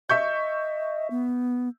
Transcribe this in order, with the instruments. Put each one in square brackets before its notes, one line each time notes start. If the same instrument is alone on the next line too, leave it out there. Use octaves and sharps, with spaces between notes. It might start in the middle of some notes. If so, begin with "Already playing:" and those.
[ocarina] D#5 [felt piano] E5 C#6 G6
[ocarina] B3